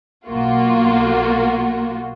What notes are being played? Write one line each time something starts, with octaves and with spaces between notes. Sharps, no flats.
B1 A#3 F4 F#4